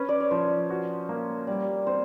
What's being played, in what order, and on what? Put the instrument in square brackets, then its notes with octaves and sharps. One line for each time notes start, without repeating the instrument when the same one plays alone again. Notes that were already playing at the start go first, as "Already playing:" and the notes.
Already playing: [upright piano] C#4 [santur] B4
[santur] D5
C#5
[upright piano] F3 [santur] C5
[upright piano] F#4
A#3
[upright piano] G3 [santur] D5
[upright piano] C4 [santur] C5